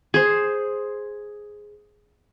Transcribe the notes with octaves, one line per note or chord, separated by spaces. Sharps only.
G#4 C5